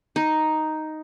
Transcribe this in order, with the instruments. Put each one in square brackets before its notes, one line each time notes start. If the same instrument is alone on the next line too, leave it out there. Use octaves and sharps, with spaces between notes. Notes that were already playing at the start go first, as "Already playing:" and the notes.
[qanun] D#4